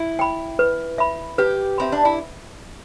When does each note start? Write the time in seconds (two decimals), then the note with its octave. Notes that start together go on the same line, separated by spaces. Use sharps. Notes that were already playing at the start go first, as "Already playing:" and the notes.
Already playing: E4
0.19 G5 B5
0.59 B4
0.98 E5 B5
1.38 G4 B4
1.78 C4 E5 B5
1.92 D4
2.05 E4